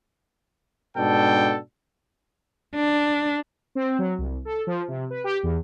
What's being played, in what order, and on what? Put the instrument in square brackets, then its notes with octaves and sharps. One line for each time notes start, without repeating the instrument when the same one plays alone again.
[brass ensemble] G#2 B2 D4 A4 G5
[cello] D4
[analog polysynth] C4
F#3
C2
A4
F3
C3
B4
G4
E2